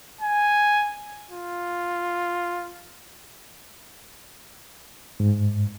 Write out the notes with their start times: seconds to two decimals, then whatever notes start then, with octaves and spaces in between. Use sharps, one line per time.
0.21 G#5
1.31 F4
5.20 G#2